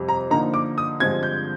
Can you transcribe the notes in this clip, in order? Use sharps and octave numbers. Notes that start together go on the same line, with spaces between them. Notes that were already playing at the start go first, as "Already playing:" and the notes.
Already playing: F2 C3 G3
A#5
D3 F3 A#3 D#4 A#5
D6
D#6
G2 D3 F3 G#3 C4 G#6
G6